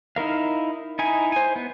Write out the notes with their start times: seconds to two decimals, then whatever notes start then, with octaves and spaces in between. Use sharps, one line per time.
0.16 D#4 E4 A#4 F5
0.99 D#4 E4 G#5
1.32 C5 G#5
1.56 B3